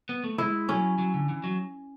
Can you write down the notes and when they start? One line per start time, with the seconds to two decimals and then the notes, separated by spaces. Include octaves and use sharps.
0.09 B3
0.24 A3
0.38 G#3 E4
0.69 F#3 C#4
0.98 F#3
1.14 D3
1.29 E3
1.44 F#3